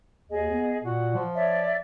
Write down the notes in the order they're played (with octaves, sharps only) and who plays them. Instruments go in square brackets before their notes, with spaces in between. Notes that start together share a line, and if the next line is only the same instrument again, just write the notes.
[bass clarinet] D#2 [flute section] G#4 D#5
[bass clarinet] B3
[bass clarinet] A#2 [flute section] F#4
[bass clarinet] F3
[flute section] C#5 D5 E5